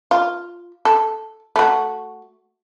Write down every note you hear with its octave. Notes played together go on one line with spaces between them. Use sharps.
F4
A4
A3 F#4